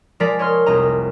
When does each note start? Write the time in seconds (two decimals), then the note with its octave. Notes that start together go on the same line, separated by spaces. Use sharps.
0.20 F3 G#3 A#4 D5 B6
0.39 C#5 D#5 C6 F6
0.66 F1 C2 D#5 A#5